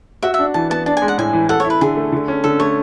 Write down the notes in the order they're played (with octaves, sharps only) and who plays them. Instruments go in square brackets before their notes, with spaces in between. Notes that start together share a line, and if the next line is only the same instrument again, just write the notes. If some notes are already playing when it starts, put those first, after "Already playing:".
[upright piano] F#4 [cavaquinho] E5
[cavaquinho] E5
[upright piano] D4
[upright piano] E3 [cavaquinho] A5
[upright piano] B3 [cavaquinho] A5
[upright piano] D4 [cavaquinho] A5
[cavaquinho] G#5
[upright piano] G#3
[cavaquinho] F#5
[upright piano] A2 [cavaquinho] G#5
[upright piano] E3
[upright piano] A4 [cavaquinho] F#5
[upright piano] E4 [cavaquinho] C#5
[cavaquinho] B4
[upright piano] D3 [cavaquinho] G#4
[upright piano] A3
D3
C#4
[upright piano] D3 [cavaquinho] A4
[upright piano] A3 [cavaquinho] C#5